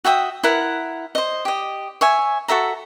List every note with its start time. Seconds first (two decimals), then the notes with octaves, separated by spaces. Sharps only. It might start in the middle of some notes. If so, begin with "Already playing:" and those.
0.05 F#4 E5 G5 D#6
0.43 E4 A#4 F#5
1.15 C5 D#5
1.45 G4 D#5
2.01 C#5 E5 G#5
2.48 F#4 A4 E5 A#5